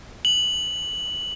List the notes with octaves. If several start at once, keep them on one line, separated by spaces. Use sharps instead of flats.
F#7